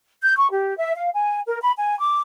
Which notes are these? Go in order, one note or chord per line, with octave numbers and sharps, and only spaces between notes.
G6
C#6
G4
E5
F5
G#5
A#4
B5
G#5
D6